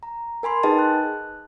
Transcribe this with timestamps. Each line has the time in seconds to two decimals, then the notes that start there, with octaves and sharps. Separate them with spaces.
0.03 A#5
0.43 A#4 G#5 B5 C6
0.63 D#4 G#4 B4 D#5 G5 A5
0.79 F#6